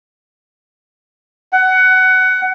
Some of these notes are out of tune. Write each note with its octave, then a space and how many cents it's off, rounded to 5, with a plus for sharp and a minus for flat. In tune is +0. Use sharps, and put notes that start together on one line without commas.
F#5 +20